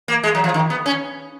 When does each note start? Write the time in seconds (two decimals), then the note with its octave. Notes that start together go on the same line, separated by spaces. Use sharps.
0.08 A#3
0.24 G#3
0.35 F#3
0.44 F3
0.54 D#3
0.70 B3
0.86 C#4